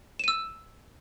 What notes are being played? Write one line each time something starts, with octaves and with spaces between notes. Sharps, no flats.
E6 D#7 E7